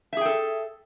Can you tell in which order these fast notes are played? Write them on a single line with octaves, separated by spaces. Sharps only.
E5 G#4 G5 A4